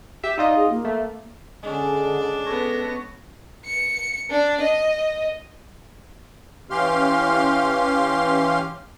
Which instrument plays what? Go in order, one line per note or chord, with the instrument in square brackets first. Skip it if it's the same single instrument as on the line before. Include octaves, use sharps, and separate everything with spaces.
[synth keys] G4 E5
[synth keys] D#4 F4 D#5 [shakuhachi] D5
[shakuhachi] G#4
A#3
[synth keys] A3
[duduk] D3 [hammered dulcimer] G#3 C#4 [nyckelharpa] D4
[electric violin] B3 A#6 [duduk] A4 [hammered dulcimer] C#5
[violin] C#7
D4
D#5
[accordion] E3 C#4 G4 F5 C6 F6